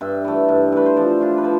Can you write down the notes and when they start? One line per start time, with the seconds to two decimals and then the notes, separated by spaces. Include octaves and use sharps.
0.01 G2 E5
0.24 E3 A3
0.49 G2
0.72 E3 A3 B4
0.86 C5
0.96 F3 D5
1.20 A3 D4 F4
1.38 B4
1.44 F3 C5